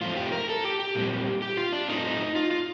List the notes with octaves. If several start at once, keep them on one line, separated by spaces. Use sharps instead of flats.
A2 F3 A3 C4 F4
G4
A#4
A4
G4
G4
A#2 G3 C4
G4
F4
D4
A2 A3 C4 D#4
F4
F4